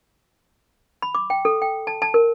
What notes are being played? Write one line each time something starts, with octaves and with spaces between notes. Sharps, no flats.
B5
D6
G5
A4
G5
A5
A5
A#4